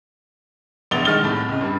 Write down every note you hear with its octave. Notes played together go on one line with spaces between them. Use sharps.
E1 A#1 B3 A6 F7 G7
D#3 G#3 F6 A6 G7
C2 A2
C#2 C#3
G2 G3